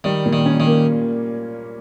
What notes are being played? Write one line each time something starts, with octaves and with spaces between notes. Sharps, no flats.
D#3 G3
A#2
D#3
C#4
D#3
A#3